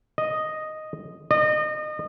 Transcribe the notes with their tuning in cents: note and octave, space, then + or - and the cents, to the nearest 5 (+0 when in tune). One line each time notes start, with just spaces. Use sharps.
D#5 +0
D#5 -30